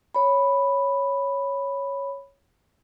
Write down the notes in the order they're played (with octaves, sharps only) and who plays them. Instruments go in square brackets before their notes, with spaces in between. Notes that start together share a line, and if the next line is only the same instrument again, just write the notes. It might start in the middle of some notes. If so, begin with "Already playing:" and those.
[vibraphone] C#5 B5